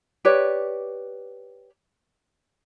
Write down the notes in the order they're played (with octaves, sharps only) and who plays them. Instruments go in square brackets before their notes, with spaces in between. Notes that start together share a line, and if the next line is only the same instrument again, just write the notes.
[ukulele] G4 B4 C#5 D5